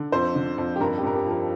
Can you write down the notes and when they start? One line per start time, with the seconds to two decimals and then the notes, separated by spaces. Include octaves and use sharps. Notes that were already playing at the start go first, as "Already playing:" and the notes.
Already playing: D3
0.12 F2 C5
0.35 D3
0.58 F2
0.76 G4
0.80 G2 A#4
0.98 G4
1.03 G2 A#4
1.15 G4
1.26 F3
1.31 A#4